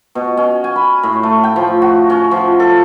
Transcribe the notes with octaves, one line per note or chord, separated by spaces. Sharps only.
B2
C#4
G#5
B5
A2
A3
G5
F3
F#4
C#4
F3
A4